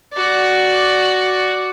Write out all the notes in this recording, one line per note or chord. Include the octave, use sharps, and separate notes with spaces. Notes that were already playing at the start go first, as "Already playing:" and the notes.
F#4 D5